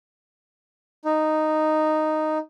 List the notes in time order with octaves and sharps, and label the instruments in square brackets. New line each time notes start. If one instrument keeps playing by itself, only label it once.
[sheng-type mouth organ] D#4